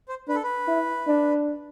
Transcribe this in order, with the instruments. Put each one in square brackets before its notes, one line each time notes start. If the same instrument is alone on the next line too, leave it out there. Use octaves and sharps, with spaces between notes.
[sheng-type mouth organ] C5
[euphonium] D4 [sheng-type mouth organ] B4
[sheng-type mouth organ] A4
B4
[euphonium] E4
D4